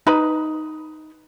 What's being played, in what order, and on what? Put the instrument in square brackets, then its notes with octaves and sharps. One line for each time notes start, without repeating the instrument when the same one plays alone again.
[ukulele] D#4 B4 B5